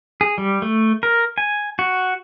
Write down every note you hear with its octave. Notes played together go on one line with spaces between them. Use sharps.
G#4
G3
A3
A#4
G#5
F#4